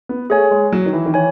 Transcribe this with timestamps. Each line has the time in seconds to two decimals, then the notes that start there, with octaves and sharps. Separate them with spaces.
0.09 B3
0.30 A3 G#4 C#5 G#5
0.51 G#3
0.73 F#3
0.86 D#3
0.93 E3
1.06 D#3
1.14 E3 C#5 G#5